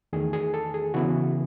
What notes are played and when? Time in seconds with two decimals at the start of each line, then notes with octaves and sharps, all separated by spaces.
0.13 E2 D#3 A3 G#4
0.33 G#4
0.54 A4
0.74 G#4
0.94 C#3 E3 B3 E4 F#4